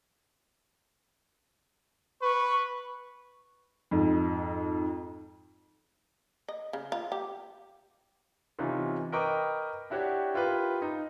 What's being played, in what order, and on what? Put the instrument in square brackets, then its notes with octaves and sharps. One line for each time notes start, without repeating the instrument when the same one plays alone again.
[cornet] B4 [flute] C#6
[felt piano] F2 G#2
[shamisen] D#5
C#3
F4
G4
[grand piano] C3 E3 C#4 D#4 F4
A#4 B4 D#5 G5 C#6 D6
D4 E4 F#4 G4 C#5 E5
E4 F4 G4 A#4 B4
D#4